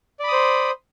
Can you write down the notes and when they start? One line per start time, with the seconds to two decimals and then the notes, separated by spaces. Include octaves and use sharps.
0.20 D5
0.24 B5
0.28 D#6
0.32 C5